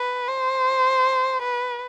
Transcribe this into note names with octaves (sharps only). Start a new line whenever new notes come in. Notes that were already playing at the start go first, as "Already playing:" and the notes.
Already playing: B4
C5
B4